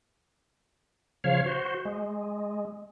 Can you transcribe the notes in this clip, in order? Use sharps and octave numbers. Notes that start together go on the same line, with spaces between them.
C#3 F3 C#5 F5
F#4 C5
G#3